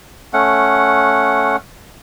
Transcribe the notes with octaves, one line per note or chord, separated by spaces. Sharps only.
A3 C#4 F#5